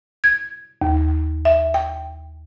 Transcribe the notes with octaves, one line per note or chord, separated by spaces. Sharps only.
G#6
D#2
E5
G5